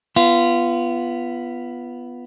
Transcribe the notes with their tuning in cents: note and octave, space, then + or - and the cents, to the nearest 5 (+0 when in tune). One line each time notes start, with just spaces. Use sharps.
B3 +0 F4 -25